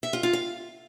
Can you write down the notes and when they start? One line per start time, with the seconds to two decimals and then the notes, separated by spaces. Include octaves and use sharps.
0.03 E5
0.13 F4
0.23 F4
0.33 F5